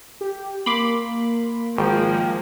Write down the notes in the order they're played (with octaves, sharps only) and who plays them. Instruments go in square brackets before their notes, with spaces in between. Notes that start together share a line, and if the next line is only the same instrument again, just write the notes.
[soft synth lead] G4
[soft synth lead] A#3 [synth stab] B5 C6 D6
[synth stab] G#1 [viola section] F3 G#3 A#3 [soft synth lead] G5